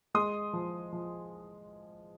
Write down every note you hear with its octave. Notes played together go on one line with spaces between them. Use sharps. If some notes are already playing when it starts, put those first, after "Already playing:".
G#3 C6 D#6
F3
F3